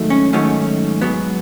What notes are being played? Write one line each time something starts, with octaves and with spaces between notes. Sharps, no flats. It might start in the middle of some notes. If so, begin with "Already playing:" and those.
Already playing: G#2 D#3 F#3 A3
C#4
G#2 D#3 F#3 A3 C#4
G#2 F#3 B3